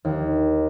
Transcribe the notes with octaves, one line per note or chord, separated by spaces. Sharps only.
D#2